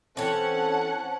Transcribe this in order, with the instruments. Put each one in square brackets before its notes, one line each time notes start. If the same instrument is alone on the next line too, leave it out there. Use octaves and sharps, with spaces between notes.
[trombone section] E3 A4 [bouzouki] C4 C#5 [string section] C#4 F#5 [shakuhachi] A5